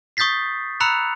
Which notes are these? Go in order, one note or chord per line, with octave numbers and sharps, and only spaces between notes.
C#6 D#6 G6 A6 B6 C7
A#5 B5 E6 F#6 C#7 F7